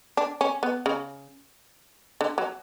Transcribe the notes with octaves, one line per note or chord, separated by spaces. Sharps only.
D4
C#4
B3
C#3
D3
F#3